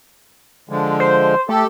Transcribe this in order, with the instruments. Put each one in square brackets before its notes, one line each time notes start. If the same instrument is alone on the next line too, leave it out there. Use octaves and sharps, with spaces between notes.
[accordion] D3 F3 G#3
[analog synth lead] C5
[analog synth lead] A3 [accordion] G4 A4